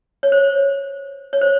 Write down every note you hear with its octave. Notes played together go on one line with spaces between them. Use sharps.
C#5
C5
C#5
C5